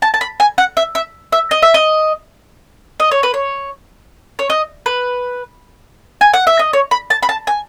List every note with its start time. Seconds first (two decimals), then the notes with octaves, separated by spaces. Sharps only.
0.02 A5
0.14 A5
0.21 B5
0.40 G#5
0.58 F#5
0.77 E5
0.95 E5
1.32 E5
1.51 D#5
1.62 E5
1.74 D#5
3.00 D#5
3.11 C#5
3.23 B4
3.34 C#5
4.39 C#5
4.50 D#5
4.86 B4
6.21 G#5
6.33 F#5
6.47 E5
6.59 D#5
6.73 C#5
6.91 B5
7.10 A5
7.23 B5
7.29 A5
7.47 G#5